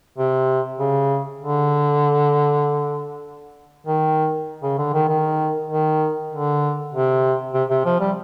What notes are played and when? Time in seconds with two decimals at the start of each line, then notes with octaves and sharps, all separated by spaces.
0.18 C3
0.78 C#3
1.40 D3
3.86 D#3
4.63 C#3
4.78 D3
4.94 D#3
5.09 D#3
5.70 D#3
6.32 D3
6.93 C3
7.54 C3
7.70 C3
7.85 F3
8.00 G3